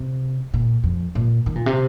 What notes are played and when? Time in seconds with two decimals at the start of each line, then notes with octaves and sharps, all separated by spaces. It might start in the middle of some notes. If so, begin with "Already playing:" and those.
Already playing: C3
0.54 A#2
0.84 F2
1.15 A#2
1.46 D#3
1.56 A#2
1.66 C3